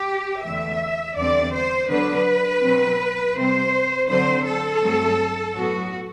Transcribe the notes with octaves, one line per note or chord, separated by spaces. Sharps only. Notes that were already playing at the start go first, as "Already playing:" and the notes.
Already playing: G4
E2 D3 A3 E5
E2 D3 G3 C4 D5
C5
D3 F#3 B3 D4 B4
B2 F#3 C4
C3 G3 C4 C5
D3 F#3 C4 C5
A4
G2 F#3 A3 C4
A2 F#3 B3 F#4